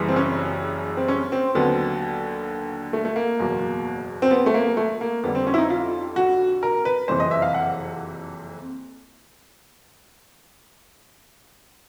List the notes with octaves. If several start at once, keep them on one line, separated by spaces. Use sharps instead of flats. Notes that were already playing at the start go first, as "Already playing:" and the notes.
Already playing: F#1 F#2 C#3 E3 G3
C4
C#4
C4
C#4
C4
D#2 D3 F#3 B3
A3
A3
A#3
F#1 E2 B2 F#3
C4
B3
A3
A#3
A3
A#3
F2 D3 G3 B3
C4
C#4
E4
D#4
F4
F#4
A#4
B4
F#1 F2 C3 E3 C5
D#5
E5
F5
F#5